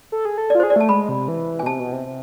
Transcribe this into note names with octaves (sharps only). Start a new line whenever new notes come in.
A4
G#4
A4
D5
F4
C5
G#4
D5
A3 A5
G#3 B5
C3
E3
G#5
B2
C3 A5
B2
C3
C3